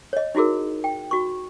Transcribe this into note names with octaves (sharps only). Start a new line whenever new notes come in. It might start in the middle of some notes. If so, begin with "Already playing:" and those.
C#5 D#5
D#4 E4 F#4 G#4 A#4
G5
F#4 C#6